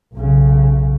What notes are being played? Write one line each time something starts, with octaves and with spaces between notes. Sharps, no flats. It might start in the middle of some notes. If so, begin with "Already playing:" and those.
B1 C#3